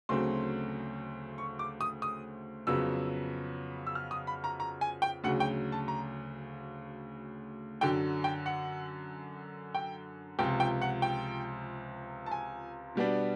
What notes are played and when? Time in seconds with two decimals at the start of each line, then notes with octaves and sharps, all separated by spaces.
0.09 D2 C#3 F#3 A3 C4 C6
1.38 C#6
1.59 D6
1.81 D#6
2.02 D#6
2.67 F2 C#3 F#3 B3 E6
3.87 E6
3.95 F6
4.11 D#6
4.27 B5
4.44 A#5
4.60 A#5
4.81 G#5
5.02 G5
5.24 D2 C#3 F#3 F#5
5.40 G5
5.72 A5
5.88 A#5
7.81 F#2 D3 F#3 G5
8.24 G5
8.46 F#5
9.75 G5
10.39 C#2 C3 F3 G5
10.60 G5
10.82 F#5
11.02 G5
12.26 A5
12.31 G#5
12.95 B2 G3 B3 D4